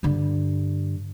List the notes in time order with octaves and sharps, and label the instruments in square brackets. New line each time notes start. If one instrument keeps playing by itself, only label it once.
[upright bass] G2 D3